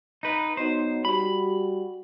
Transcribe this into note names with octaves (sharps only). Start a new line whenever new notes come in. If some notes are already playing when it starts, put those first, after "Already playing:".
D#4 B4
F#3 B3 D#4 C5
G3 F#4 B5